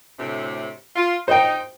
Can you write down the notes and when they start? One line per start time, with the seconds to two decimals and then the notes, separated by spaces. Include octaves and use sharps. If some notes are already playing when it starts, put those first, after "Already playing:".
0.19 D2 A2 C3
0.96 F4
1.28 D#4 C5 G5